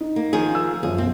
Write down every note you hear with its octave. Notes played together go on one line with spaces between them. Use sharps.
D#4
A#3
D#3 F3 G#4
E6
F#2 F3 G#4
B1 C4